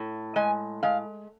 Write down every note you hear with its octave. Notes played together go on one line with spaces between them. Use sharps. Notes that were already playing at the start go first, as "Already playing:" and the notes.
Already playing: A2
G#3 G#5
G#3 F5